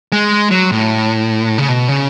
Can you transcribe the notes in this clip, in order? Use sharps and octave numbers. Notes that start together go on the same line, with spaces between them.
G#3
F#3
A2
C#3
B2
C#3